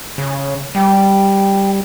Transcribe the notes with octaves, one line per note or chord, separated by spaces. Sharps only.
C#3
G3 G5